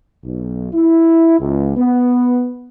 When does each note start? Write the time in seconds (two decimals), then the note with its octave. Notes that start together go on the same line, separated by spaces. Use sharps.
0.24 B1
0.73 E4
1.39 C#2
1.76 B3